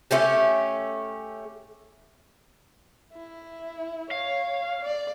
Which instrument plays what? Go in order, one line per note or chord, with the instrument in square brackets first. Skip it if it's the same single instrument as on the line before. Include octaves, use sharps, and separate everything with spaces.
[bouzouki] A3 C#4 G4
[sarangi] E4
[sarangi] C#5 [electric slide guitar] F5
[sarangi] D5